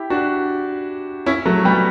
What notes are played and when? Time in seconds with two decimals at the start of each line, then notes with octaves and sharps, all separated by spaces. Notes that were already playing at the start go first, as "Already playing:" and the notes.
Already playing: E4 G4
0.10 D4 F#4
1.26 C#4 E4
1.46 F#3 A3
1.65 G3 B3